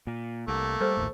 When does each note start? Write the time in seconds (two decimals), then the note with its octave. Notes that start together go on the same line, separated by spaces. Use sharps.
0.07 A#2
0.48 C2 A3 A#3
0.81 G3 A4 C5
0.97 A#1 D#2 A2